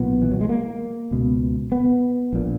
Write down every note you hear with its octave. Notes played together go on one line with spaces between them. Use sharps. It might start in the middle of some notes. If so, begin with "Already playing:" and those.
Already playing: B1 A#2 B3
E3
F#3
G#3
A#3
C#2 B2
B3
A#1 A#2